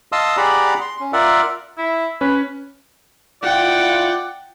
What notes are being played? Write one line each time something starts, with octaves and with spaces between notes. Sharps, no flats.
D#5 F5 A5 C6 D#6 E6
G4 G#4 D5 F#5 A#5 B5
C6
C#4
F4 A#4 D5 E5 F#5
E4
C#4 B4
E4 F4 D5 F#5 G5